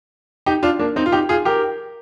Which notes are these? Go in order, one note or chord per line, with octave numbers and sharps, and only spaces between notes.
D#4 G4
D4 F4
A#3 D4
C4 D#4
F4
D#4 G4
F4 G#4
G4 A#4